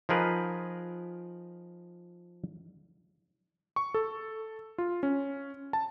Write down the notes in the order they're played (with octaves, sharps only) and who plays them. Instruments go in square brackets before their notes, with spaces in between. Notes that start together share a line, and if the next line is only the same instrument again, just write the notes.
[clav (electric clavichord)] F3 D#4 G#4 A#4 B4
[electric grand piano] C#6
A4
F4
C#4
A5